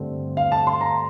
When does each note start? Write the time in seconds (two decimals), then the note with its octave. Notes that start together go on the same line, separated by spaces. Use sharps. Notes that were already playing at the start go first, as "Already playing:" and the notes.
Already playing: G2 D3 A3 C4
0.37 F5
0.52 A5
0.67 C6
0.81 A#5